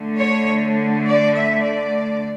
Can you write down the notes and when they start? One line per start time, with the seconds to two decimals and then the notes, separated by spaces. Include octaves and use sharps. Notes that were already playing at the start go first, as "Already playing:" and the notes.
Already playing: D3 A3
0.18 C#5
1.04 D5
1.33 E5
1.62 D5